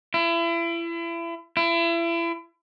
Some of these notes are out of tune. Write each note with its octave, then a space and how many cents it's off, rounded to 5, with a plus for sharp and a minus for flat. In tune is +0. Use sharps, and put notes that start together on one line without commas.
E4 +35
E4 +35